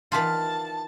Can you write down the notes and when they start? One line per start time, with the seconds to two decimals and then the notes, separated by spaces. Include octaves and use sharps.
0.12 D#3 E3 F4 A5